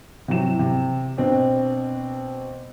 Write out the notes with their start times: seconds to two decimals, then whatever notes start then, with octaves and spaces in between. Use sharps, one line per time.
0.28 C3 E3 F#3 E7
0.59 C3
1.17 B2 C4 D4